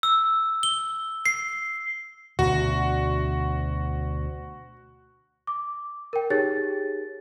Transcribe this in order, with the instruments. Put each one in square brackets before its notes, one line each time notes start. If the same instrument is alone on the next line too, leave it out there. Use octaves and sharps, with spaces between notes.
[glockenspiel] E6
G7
C7
[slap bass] D2 B2 D3 [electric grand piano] F#4
[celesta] D6
A#4 G5
D#4 G4 G#4 C#5 A6